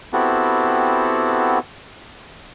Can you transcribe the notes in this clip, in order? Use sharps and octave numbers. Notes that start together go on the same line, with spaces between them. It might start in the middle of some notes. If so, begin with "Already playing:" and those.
B3 C4 E4 F#4 G4 A4